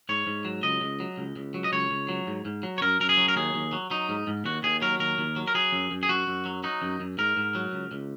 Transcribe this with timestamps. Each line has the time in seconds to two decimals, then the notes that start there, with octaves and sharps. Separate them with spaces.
0.09 G#2 C#5
0.27 G#2
0.45 F#3
0.63 C#2 D#5
0.81 C#2
1.00 F#3
1.18 C#2
1.36 C#2
1.54 F#3
1.64 D#5
1.72 C#2 C#5
1.91 C#2
2.09 F#3
2.27 G#2
2.45 G#2
2.63 F#3
2.78 C#5
2.81 F#2 A#4
3.00 F#2 A#4
3.09 G#4
3.18 F#3
3.28 A#4
3.36 D#2 G#4
3.54 D#2
3.73 F#3
3.90 F#3 D#4
4.09 G#2
4.27 G#2
4.45 D#2 F#4
4.63 D#2 G#4
4.82 F#3 A#4
5.00 D#2 A#4
5.18 D#2
5.36 F#3
5.48 A#4
5.54 F#3 G#4
5.72 F#2
5.91 F#2
6.03 G#4
6.09 F#2 F#4
6.27 F#2
6.45 F#3
6.64 F#3 D#4
6.82 F#2
7.00 F#2
7.18 G#2 A#4
7.37 G#2
7.55 F#3
7.73 C#2
7.91 C#2